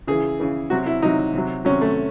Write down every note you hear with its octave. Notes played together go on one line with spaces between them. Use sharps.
C#3 E3 G#4
C#3 E3
C3 F#3 F#4
E4
C3 F#3 D#4
C3 F#3
C3 F#3 C#4
A3